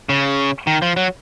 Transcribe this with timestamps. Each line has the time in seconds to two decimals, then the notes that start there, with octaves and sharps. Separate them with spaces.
0.09 C#3
0.67 D#3
0.82 F3
0.97 F#3